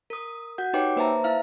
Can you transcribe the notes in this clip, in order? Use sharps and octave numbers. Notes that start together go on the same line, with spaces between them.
A#4 D#6
F#4 F#5 G6
D#4 G4 B4 C#5 G5 D6
A#3 B4 C5 E5 A5 A#5
E4 E5 F5 F6